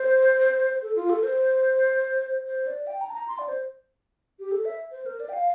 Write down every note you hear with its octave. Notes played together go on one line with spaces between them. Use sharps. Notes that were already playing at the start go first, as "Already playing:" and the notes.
Already playing: C5
A4
F4
A4
C5
C5
D5
G5
A#5
A5
A#5
C6
D5
C5
G4
A4
E5
C5
A#4
D5
G5
F5